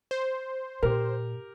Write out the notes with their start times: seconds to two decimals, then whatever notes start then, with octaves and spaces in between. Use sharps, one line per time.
0.11 C5
0.83 A#2 G4 A#4